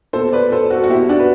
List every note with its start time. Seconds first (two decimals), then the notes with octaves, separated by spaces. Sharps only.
0.13 B2 A4 C5
0.32 B4 D5
0.52 A4 C5
0.71 F#4 A4
0.84 F#4
0.89 B2 E4 G4
1.09 D4 F#4
1.19 B4